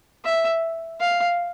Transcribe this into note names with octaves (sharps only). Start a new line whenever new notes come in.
E5
F5